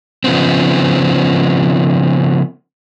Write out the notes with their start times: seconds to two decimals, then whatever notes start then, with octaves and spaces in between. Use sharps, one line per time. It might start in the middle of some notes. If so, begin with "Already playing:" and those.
0.24 C#3 F3 B3 C4